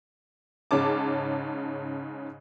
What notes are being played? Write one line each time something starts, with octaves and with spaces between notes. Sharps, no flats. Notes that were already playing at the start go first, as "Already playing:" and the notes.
G#2 C#3 C#4 A5 D6